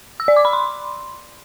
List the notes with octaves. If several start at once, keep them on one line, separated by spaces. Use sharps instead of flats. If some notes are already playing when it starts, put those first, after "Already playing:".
E6
D5
D6
B5
C6